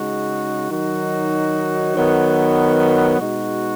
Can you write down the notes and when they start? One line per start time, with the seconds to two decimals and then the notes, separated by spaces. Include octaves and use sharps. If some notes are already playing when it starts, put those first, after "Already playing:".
Already playing: C#3 G#3 D#4 F#4
0.69 D#3 F#3 D#4 F#4
1.94 D#3 F#3 B3
3.18 B2 G#3 D#4 F#4